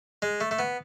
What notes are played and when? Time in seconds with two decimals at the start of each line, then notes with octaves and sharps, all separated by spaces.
0.22 G#3
0.41 A3
0.51 A3
0.59 B3